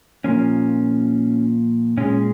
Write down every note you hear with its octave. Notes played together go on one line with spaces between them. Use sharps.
A#2 F3 A#3 C#4
A#2 G#3 C#4